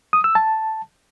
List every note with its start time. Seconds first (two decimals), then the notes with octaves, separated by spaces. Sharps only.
0.13 D#6
0.24 E6
0.35 A5